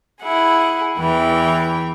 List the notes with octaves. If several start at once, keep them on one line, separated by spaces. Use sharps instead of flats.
E4 G#4 F#5
E2 E3 G5